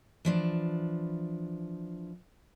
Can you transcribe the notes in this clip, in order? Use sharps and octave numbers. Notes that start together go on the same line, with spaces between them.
E3 F3 D4